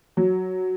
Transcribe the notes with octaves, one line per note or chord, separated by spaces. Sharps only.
F#3